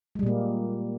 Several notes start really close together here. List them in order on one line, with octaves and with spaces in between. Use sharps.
G#3 G3 A#2 A#3